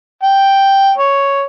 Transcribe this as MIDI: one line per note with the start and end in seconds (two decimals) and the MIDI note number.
0.23 0.92 79
0.98 1.46 73